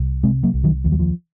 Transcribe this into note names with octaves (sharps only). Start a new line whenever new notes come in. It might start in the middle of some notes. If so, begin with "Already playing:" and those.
Already playing: C2
C3 G#3 C4
F#3 A#3
C2
D#3 F#3
D#2 F3
F#3
F3